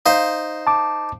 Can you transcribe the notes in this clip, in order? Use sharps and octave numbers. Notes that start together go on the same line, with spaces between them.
D#4 C5 F5
A5 D6